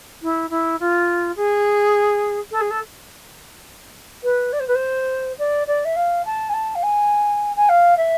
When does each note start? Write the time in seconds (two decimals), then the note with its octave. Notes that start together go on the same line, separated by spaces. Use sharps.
0.23 E4
0.50 E4
0.80 F4
1.36 G#4
2.51 A4
2.61 G#4
2.71 A4
4.24 B4
4.53 D5
4.60 C5
4.68 B4
4.75 C5
5.39 D5
5.67 D5
5.85 E5
5.96 F5
6.26 A5
6.49 G#5
6.54 A5
6.75 F5
6.83 G#5
7.56 G#5
7.69 F5
7.97 E5